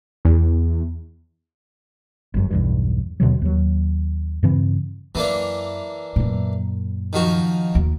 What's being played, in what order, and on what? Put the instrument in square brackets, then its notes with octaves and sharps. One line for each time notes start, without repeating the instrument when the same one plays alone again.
[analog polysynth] E2
[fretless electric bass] G1 F#2
B1 E2 G2
D#2 B2 D3 F#3
D#2 F#3
G2 C#3 E3 C4
[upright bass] F#2 [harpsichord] E3 A#3 D4
[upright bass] F#2 A#2
[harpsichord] D#3 F3 F#4
[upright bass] D#2